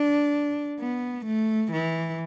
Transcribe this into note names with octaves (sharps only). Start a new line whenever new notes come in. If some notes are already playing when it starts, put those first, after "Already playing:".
Already playing: D4
B3
A3
E3